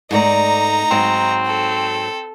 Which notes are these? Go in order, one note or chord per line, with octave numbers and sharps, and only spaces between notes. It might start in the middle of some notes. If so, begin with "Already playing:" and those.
G#2 A3 D#4 D5 A#5
G#2 F#3 C4 C5
A4